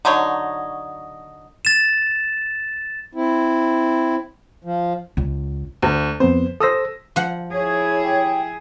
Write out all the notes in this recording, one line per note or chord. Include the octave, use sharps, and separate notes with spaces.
D3 F#3 D#4 C#5
A6 E7
C4 E4
F3
C#2
D2
F2 B3 C4 C5
A4 C5 D#6 E6 A#6
F3 F#5
E4 G#4 C#5
G4